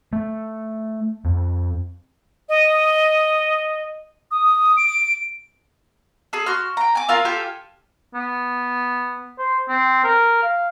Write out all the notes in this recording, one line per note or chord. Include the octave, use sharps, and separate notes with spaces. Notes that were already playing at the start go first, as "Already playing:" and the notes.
A3
F2
D#5
D#6
D7
G#4 A4
F#4 C6 F6
G5 A#5
G#5 D6
F4 A#4 F5 E6
F4 G4 A4 G#5
B3
C5
C4
A#4
F5